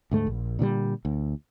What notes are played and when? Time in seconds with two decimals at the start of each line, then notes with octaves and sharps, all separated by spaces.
0.11 D2 G#2 A3
0.27 A#1
0.59 A#2 D3 E3 G3
1.05 D2